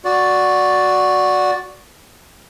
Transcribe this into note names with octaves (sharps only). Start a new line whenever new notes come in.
F#4 D5